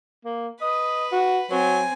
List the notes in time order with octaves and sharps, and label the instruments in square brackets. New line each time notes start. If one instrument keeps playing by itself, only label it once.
[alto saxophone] A#3
[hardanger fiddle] B4 [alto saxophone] D#5
[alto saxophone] F#4
[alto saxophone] F#3 [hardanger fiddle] C4 G#5